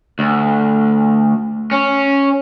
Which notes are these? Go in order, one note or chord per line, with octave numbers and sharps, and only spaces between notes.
D2
C#4